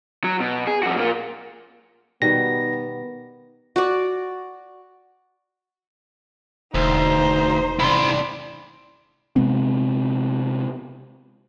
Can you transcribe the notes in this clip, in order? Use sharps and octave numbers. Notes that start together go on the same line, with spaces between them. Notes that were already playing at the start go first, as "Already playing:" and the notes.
F#3
B2
G#4
F2 F#4
A#2 A#3
B2 D#3 G3 B3 A#6
F#4 D5
E1 D2 D#4 C5
C2 D4 E4 C6
C3 G#3 B3 C4